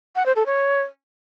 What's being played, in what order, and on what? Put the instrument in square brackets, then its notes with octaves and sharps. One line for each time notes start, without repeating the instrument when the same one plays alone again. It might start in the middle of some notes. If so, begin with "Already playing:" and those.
[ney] F#5
C5
A4
C#5